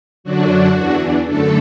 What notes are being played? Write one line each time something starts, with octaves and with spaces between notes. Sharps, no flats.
F#2 D3 F#3 D4 F#4
E2 E3 D4
F#2 D3 A3 A4